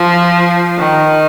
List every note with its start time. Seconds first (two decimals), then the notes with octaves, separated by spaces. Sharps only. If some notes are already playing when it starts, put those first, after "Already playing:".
Already playing: F3
0.79 D#3